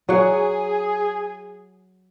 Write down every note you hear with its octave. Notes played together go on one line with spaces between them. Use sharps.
F#3 G#4 F#5